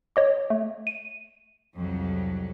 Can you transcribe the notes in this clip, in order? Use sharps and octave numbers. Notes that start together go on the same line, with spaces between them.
C#5 D#5 D6
A3
D#7
C2 F2 F#3